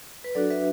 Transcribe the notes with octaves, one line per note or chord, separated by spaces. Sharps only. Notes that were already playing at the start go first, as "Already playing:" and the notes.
B4
F#3 D4 F#4 A4 D5
B4 E5